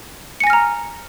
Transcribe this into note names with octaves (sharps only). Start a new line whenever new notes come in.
G#5 A#5 F6 A#6 C#7